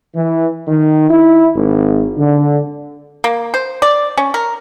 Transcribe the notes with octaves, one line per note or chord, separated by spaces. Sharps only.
E3
D#3
E4
G#1
D3
A#3
C5
D5
C#4
A#4